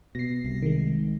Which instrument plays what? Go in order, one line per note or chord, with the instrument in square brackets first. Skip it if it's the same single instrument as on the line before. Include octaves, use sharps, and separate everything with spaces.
[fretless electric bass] B2 [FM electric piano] A#6 C7
[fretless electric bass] C2
[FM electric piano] D#3 G#3